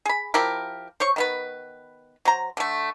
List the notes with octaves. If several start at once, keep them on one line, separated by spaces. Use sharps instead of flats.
G#4 B5
F3 E4 G4 A#4
C5 C#5 C#6
D#3 B3 B4
F#3 C5 A#5
D3 A3